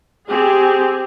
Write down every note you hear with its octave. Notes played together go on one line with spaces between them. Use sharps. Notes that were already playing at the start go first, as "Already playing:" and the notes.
C4 G4 G#4